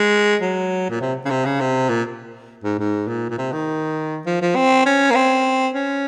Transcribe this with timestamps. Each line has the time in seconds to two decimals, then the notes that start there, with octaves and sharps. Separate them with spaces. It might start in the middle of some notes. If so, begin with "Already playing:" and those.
Already playing: G#3
0.41 F#3
0.89 A#2
1.01 C3
1.25 C#3
1.30 C3
1.45 C#3
1.60 C3
1.89 A#2
2.64 G#2
2.79 G#2
3.08 A#2
3.30 A#2
3.38 C3
3.52 D#3
4.26 F3
4.41 F3
4.55 C4
4.86 C#4
5.10 A#3
5.15 C4
5.74 C#4